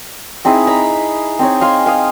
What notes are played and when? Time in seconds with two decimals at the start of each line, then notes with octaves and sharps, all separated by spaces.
0.45 C4 D#4 E4 G#4
0.67 A#5 B5
1.39 C4 D#4 C#5
1.61 F5 G#5 C6
1.86 F5 G#5 D#6